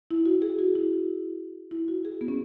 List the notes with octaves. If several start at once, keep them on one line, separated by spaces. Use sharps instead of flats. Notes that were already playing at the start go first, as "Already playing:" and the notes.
E4
F#4
G#4
F#4
E4
E4
F#4
G#4
B3
C#4